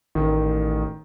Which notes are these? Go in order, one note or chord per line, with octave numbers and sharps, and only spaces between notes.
A1 D#3